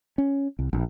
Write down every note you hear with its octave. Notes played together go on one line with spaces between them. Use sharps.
C#4
C2
A#1